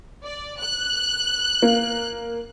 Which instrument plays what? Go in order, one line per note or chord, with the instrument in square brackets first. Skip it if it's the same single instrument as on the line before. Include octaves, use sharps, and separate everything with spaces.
[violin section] D5
F#6
[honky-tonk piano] A#3